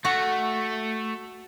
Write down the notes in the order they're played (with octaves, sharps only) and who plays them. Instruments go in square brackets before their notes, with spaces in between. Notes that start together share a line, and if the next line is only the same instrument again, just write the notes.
[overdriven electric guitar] A3 [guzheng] F#4